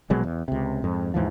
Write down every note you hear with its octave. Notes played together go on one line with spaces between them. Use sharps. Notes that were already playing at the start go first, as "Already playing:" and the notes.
A#1 B2 F#3 G#3
E2
C#2 C3
F2 G#2
D#2 G#2 E3 F3